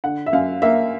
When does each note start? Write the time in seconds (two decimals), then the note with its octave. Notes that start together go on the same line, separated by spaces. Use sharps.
0.04 D3 F#5
0.26 E5
0.33 F#2 F5
0.62 A#3 E5